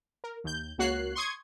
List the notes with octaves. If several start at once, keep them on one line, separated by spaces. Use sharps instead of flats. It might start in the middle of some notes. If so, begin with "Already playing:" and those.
A#4
D#2 G6
C#2 A#3 F#4 C#5 F#6 C7
C6 C#6 D#6 G#6